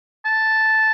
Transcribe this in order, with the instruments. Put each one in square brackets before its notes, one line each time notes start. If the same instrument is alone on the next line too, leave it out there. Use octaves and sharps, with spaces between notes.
[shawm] A5